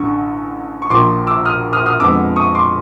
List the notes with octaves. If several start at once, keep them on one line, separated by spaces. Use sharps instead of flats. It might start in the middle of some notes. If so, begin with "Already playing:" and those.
Already playing: A1 G2 D3 C#6
C#6
A#1 A#2 F3 C6 D6
D6 E6
D#6 F6
D#6 F6
D#6 F6
F2 D3 F3 G#3 B3 D6 E6
C#6 D#6
C6 D6